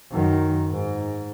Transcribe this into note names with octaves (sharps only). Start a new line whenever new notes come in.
F#2 D#3
G#2